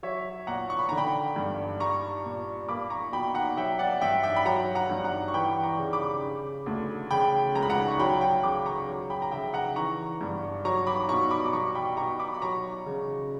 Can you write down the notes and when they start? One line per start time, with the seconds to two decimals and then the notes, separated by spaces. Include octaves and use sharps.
0.03 F#3 C#5 E5
0.47 A#2 F#5 A#5
0.70 C#6
0.79 B5
0.89 D3 A#5
0.97 G5 B5
1.36 G2
1.80 G3 A#5 C#6
2.25 A#2
2.68 A#3 B5 D6
2.90 A#5 C#6
3.12 B2 G5 B5
3.34 F#5 A#5
3.57 F#3 E5 G5
3.79 D5 F#5
4.01 G2 E5 G5
4.23 E5 G5
4.36 B5
4.45 F#3 F#5 A#5
4.75 F#5 A#5
4.90 G2
5.04 F#5 A#5
5.28 C#6
5.34 E3 G5 B5
5.63 A#5 C#6
5.78 C#3
5.93 B5 D6
6.23 C#3
6.66 D2
7.11 C#3 G5 B5
7.55 C#2 A#5
7.63 B5
7.70 F#5 A#5
7.88 C#6
7.99 F#3 G5 B5
8.21 G5 B5
8.43 C#3 B5 D6
8.66 A#5 C#6
8.88 F#3
9.10 G5 B5
9.22 A#5
9.31 C#3 E5 G5
9.54 F#5 A#5
9.76 E3 A#5 C#6
10.21 G2
10.65 F#3 A#5 C#6
10.87 B5 D6
11.09 B2 A#5 C#6
11.31 B5 D6
11.46 D6
11.53 G3 A#5 C#6
11.75 G5 B5
11.97 B2 A#5 C#6
12.20 B5 D6
12.34 B5
12.42 F#3 A#5 C#6
12.86 C#3